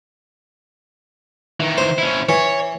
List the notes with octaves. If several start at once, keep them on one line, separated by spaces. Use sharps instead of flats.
D#3 E3
C5
C#4 E4
E3 C#5